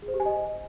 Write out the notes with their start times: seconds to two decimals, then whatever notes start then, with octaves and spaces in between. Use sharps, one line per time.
0.02 G#4
0.08 C5
0.14 G4
0.20 G#5
0.26 D#5